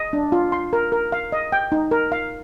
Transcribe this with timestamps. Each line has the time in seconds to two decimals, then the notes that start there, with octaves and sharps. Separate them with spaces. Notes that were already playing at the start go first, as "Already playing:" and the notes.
Already playing: D#5
0.13 D4
0.32 F4
0.52 C6
0.73 A#4
0.92 A#4
1.12 F5
1.32 D#5
1.52 G5
1.72 D#4
1.91 A#4
2.12 F5